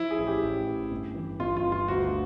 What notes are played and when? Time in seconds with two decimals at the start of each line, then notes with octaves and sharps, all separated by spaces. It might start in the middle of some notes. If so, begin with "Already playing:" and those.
Already playing: F3 E4
0.11 G#4
0.18 A1
0.27 G4
0.42 A1
0.68 A1
0.91 G1
1.15 E3
1.40 G1 F4
1.57 F4
1.65 G1
1.72 F4
1.88 D2 F#4